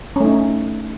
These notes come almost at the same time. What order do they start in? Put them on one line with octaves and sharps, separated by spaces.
C#4 A3 D#4